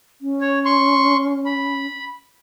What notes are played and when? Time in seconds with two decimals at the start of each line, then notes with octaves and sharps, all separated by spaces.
0.21 C#4
0.41 C#5
0.65 C6 C#6
1.46 B5